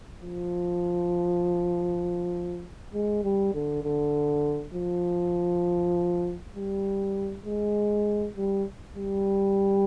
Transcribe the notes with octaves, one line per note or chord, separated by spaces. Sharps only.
F3
G#3
G3
D3
D3
F3
G3
G#3
G3
G3